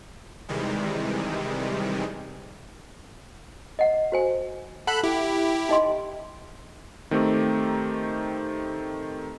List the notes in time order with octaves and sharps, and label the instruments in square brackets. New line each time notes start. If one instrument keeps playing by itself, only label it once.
[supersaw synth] C3 D#3 E3 G3 G#3
[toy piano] D#5 F#5
F#4 C5 G#5
[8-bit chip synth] A4 B5 F#6 [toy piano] F#5
[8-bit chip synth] E4 G4
[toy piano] D#4 D#5 C6
[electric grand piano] D#3 A3 C4 D#4 G4